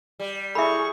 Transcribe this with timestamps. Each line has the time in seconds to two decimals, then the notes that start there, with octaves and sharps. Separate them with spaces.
0.19 G3
0.55 E4 G#4 A4 E5 B5 C#6